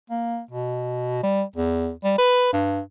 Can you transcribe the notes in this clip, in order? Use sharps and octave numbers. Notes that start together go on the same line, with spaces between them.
A#3
B2
G3
E2
G3
B4
G2